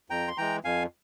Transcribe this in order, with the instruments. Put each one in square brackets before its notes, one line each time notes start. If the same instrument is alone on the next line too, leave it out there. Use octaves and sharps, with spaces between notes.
[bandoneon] F2 G5 A#5
C6
E3 G#3 G5 A#5
F2 F5 G#5